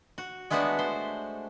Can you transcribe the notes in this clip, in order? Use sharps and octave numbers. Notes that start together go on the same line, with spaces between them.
F#4
G#3 A3 B3 D4 F#4 A5
C5